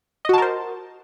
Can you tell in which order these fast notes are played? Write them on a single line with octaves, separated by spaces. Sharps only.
D#5 F#4 A5 A#4 C5